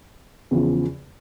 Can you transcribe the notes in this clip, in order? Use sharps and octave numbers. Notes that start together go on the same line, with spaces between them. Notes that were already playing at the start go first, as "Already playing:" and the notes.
E2 C#3 F3